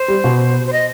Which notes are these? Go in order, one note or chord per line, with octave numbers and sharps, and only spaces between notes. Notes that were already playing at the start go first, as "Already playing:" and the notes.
Already playing: C5
G3
B2
C5
D#5